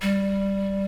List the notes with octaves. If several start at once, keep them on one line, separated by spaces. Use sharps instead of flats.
G3